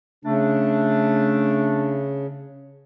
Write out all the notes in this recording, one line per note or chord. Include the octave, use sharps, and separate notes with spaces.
C#3 A3 D4